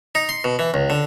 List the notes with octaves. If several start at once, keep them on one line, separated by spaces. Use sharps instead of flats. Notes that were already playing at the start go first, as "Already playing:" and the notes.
D#4
C6
B2
E3
C#2
D3